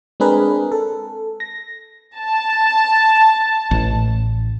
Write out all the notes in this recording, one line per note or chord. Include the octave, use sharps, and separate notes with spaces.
G#3 C4 D4 G#4 A#4 B4
A4
A#6
A5
A1